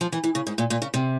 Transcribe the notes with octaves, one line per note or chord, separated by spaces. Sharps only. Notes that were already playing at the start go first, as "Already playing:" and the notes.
F3
E3
E3
C#3
G#2
A#2
A#2
C#3
C3